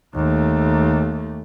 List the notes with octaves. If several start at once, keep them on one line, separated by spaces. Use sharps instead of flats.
D#2 A3